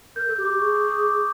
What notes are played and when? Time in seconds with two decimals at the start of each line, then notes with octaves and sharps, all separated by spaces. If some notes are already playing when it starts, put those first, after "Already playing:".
0.16 A#4 G6
0.27 A4
0.30 G6
0.38 G4
0.45 D6
0.49 G4
0.59 G#4 C#6
0.74 D6
0.89 D#6
1.03 D6